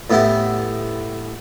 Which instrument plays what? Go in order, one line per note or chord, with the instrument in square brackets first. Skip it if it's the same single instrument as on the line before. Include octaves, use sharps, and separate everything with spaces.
[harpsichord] A2 B3 E4 G4